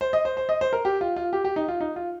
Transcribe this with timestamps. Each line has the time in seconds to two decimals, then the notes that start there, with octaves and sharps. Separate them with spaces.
0.01 C5
0.13 D#5
0.25 C5
0.37 C5
0.49 D#5
0.61 C5
0.73 A#4
0.85 G4
1.01 F4
1.16 F4
1.33 G4
1.45 G4
1.56 D#4
1.68 F4
1.81 D#4
1.96 F4